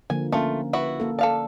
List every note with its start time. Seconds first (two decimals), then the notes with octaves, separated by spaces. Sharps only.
0.10 D3 F3 A#3 G#5
0.32 A3 A#3 C#4 F4
0.73 E4 F#4 B4
1.00 A#3 A4
1.19 A4 D5 F5 A5